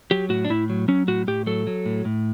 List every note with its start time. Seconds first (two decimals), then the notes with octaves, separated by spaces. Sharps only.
0.11 F#3 G4
0.29 A2 F#4
0.45 D4
0.50 A2 E4
0.70 F#3
0.88 F#3 C#4
1.08 A2 F#4
1.27 A2 G4
1.46 F#3 A4
1.67 F#3
1.85 A2
2.05 A2